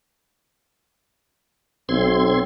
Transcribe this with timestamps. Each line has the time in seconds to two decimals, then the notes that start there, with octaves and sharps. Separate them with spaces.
1.89 B1 C4 C6 G#6